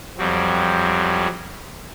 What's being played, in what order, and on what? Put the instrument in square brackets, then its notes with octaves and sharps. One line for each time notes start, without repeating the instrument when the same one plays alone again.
[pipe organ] F2 F#3 G3 C4